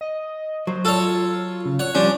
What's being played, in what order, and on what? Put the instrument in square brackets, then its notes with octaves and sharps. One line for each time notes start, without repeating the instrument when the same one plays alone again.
[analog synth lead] D#5
[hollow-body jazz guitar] F#3 [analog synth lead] C5
[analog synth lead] F4 [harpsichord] A4 C#5
[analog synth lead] C#3
[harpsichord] C#5 [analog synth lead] F#5
[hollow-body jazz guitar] F3 G3 C#4 [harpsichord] D4